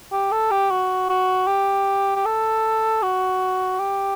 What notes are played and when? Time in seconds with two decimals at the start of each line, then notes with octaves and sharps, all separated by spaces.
0.12 G4
0.32 A4
0.51 G4
0.71 F#4
1.10 F#4
1.47 G4
2.16 G4
2.26 A4
3.03 F#4
3.79 G4